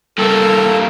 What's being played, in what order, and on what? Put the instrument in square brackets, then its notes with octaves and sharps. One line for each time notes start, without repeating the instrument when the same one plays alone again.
[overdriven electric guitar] G2 A#3 [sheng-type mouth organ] A4